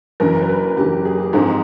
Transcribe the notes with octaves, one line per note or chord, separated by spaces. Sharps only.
F#1 F#2 C#3 E3 A#4
A#4
B4
F#1 F#2 C#3 E3 G4
G#4
G4
G#2 F3 G#3 C4 G#4